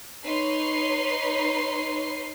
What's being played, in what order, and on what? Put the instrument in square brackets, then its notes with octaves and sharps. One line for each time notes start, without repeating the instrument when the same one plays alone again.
[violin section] D#4 B4 C#5 C6 C7